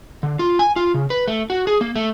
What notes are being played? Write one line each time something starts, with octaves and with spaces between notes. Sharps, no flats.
D3
F4
G#5
F4
C#3
B4
A3
F#4
G#4
A#3
A3